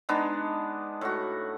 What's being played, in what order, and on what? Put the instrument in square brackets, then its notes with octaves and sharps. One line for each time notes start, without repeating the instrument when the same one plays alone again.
[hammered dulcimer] G#3 B3 D4 D#4
A2 F#4